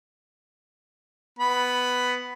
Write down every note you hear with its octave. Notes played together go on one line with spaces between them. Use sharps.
B3 B5